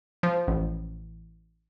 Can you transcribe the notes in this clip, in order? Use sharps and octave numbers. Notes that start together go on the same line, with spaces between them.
F3
A1